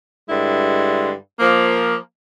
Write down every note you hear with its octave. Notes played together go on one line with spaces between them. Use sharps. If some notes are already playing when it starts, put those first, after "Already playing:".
G2 D3 G#3 E4
F3 A#3